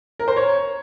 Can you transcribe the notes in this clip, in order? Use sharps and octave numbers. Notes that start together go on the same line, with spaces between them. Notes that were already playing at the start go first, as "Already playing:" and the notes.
A#4
C5
C#5